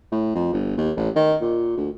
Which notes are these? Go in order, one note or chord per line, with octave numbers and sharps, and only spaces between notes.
A2
F2
G1
D#2
A1
D#3
A#2
D2